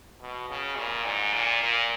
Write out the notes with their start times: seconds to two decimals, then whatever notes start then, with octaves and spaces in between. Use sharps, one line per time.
0.21 B2
0.49 C#3
0.77 A#2
1.06 G#2
1.34 A#2
1.63 A#2